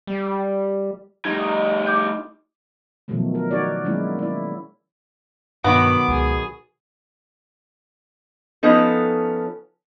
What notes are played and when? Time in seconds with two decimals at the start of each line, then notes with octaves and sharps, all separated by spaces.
0.07 G3
1.25 G3 A3 D#4 G#6
1.87 D6 G6
3.08 B2 D#3 F3 F#3 A3
3.35 A#4
3.51 D#4 F#4 C#5 D5
3.85 D#3 F#3 G#3 A#3 C#4 E4
4.19 E4 D5
5.64 G2 B2 D#3 F#3 B3 F#5 D6
6.08 C#2 G#4
8.63 F3 B3 C#4 D#4 A4